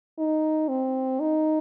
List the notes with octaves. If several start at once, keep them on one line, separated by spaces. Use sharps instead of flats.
D#4
C4
D#4